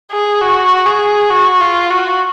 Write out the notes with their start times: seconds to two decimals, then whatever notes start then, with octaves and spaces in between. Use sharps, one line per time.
0.11 G#4
0.41 F#4
0.86 G#4
1.30 F#4
1.61 F4
1.90 F#4